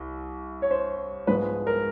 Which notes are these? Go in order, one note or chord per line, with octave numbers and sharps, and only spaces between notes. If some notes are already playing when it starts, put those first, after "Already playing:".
Already playing: C2
C#5
C5
G#2 F3 G#3 B3 B4
A#4